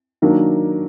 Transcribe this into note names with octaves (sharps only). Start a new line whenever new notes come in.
D#3 F#3 A#3 D4